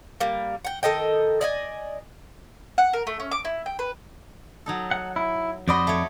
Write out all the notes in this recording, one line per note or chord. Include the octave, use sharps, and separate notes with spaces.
G3 A#3
F#5 G5
D#3 A4 D#5 G5
D5 D#5 G#5
F#5
A#4
A3
C#4
D6
E4
G5
B4
F#3 D#4 A4
F#5
E4
F2 F#4 C5 D5 D#5 B5
A3 C#5